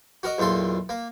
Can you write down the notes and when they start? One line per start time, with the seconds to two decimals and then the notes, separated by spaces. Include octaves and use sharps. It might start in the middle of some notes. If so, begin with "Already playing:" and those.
0.23 F#4 A#4 D#5
0.38 B1 E2 A#2 A4 C6
0.89 A#3